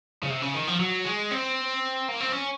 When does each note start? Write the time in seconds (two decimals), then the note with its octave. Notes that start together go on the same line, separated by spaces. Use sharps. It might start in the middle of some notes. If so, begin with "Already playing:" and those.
0.23 C#3
0.30 C3
0.42 C#3
0.54 D#3
0.67 F3
0.80 F#3
1.05 G#3
1.31 C4
2.09 A#3
2.21 C4
2.32 C#4